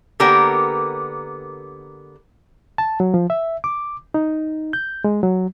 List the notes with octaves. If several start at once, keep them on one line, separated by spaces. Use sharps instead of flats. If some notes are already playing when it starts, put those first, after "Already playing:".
D3 A#3 B3 G4 A#4
A5
F#3
F3
E5
D6
D#4
G6
G#3
F#3